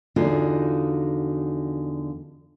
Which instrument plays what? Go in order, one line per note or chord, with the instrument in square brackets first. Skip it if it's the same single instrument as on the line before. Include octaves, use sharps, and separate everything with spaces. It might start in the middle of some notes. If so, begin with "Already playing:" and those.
[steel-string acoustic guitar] E2 D3 F3 D#4 F4 F#4